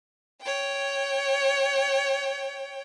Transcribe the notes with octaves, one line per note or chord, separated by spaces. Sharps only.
C#5 G5